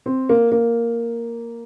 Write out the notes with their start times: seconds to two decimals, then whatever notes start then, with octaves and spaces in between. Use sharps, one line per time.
0.06 C4
0.29 A#3
0.52 A#3